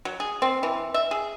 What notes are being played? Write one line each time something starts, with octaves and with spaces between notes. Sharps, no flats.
F#3
G#4
C4
E3
E5
G#4